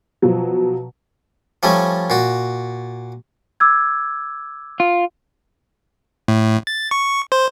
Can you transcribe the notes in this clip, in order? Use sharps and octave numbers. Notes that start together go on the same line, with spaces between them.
B2 F3 F#3
F3 G3 A3 C#4
A#2 F#4
D6 E6 G#6
F4
A2
A6
C#6
C5